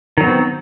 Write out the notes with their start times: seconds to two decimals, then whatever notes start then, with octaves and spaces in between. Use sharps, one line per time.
0.18 D#3
0.20 F#3
0.23 B3
0.26 C4